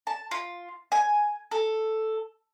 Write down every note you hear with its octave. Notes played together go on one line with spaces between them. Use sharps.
A5
F4
G#5
A4